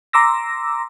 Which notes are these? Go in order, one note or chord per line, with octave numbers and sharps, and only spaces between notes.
A#5 C6 D6 E6 A#6